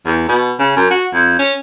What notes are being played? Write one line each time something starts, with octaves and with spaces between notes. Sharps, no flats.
E2
B2
C#3
F#2
F#4
F2
C#4